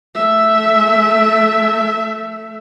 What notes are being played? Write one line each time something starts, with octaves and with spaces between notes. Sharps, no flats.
A3 E5